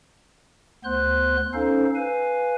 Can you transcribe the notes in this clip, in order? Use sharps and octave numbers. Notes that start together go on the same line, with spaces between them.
D2 B3 C5 C6 F#6
C#4 D#4 A4 C5 F5
B4 F5 G#5